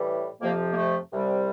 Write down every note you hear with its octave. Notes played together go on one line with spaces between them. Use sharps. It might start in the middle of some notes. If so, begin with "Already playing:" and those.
Already playing: A2 E3 G3
F2 C3 F3 A#3
A#3
A3
C2 C3 G3